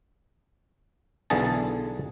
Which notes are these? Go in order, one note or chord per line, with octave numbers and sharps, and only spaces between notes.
B1 D3 E3 G#4 A5